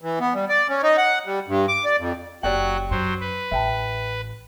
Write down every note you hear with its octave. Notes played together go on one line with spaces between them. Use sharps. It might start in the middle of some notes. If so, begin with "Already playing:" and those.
E3
B3
G3
D5
C#4
D#4
F#5
G3
G2
D6
D5
F2
F#1 F#3 F#4 G4 D5 G5 F#6
F#2 F#3 C5
B4
A1 E5 G5 A5